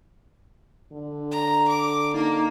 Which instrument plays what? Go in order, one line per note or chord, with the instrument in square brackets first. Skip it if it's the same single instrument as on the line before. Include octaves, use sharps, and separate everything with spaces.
[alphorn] D3
[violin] A#5
D6
[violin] A#3 [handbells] D#4